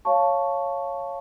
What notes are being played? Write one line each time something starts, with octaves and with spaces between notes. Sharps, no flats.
C#5 F5 A5 C#6